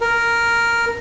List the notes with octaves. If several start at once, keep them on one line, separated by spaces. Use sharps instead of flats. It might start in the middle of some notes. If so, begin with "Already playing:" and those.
A#4